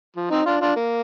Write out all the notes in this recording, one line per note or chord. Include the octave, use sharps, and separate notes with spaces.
F3
C4 D#4
D4 F4
D4 F4
A#3